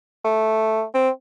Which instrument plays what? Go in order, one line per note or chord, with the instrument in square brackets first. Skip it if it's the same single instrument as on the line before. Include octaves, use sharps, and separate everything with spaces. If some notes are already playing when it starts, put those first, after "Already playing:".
[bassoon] A3
C4